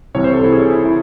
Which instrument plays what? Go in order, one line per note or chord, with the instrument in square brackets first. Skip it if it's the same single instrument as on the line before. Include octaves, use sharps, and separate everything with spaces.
[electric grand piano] C2 C3 E3 C#5
C5
A4
E4
G#4
E4
E4